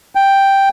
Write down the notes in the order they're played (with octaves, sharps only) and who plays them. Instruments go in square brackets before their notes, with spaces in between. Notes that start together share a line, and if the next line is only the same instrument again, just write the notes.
[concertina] G5